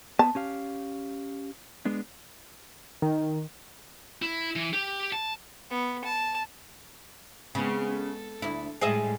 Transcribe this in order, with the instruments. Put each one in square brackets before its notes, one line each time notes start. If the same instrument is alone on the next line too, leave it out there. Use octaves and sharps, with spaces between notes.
[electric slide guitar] B3 [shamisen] A5
[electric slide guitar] C#4 G4 F5
G#3 B3 D4
[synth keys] D#3
[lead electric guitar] E4
E3
G4
A5
[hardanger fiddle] B3
A5
[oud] C#3 [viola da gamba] G#3 B3 C4
[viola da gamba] A4
[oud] D2 E4
[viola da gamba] A2 G3 G#3 [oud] G#4 D#5 E5